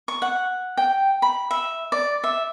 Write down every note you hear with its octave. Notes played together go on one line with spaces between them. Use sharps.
C#6
F#5
G5
B5
E5
D5
E5